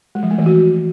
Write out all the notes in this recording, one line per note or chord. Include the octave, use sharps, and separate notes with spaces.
G#3
F3
A3
E3
F#4